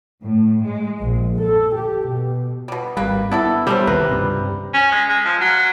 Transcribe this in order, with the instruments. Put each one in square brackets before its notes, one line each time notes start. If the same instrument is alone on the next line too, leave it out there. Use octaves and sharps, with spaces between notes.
[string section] A2
G#3
A#1
A4
G4
B2
[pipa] B2 G3
[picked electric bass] G#1 G3 [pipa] A#3 B4
[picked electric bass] B3 [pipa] D4 E4 A4
[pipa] F#3 C#4 C5 [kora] G3 E5
[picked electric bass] D#2 C3 D#3 [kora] B4 [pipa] A#5
[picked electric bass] C#2 G2 C3
[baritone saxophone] C#4
G#3
G#3
F3
F#3